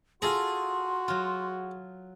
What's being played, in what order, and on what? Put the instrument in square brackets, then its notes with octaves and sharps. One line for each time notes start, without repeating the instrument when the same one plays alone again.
[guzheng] F4 A4 A#5 [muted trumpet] F#4 [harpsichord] G#4 [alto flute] C6
[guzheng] F#3 F4